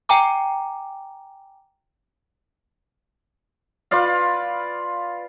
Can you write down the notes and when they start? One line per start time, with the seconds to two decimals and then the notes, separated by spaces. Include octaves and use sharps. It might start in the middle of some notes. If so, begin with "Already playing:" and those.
0.09 G5 G#5 A#5 D6
3.91 F4 B4 D5 F5